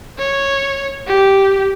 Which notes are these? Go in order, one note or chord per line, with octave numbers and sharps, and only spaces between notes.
C#5
G4